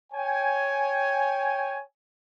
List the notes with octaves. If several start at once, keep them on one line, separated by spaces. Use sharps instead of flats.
C#5 G5 G#5